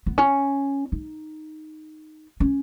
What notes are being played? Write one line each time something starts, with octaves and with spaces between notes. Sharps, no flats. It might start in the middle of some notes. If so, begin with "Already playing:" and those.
B3
C#4
D#4
C#4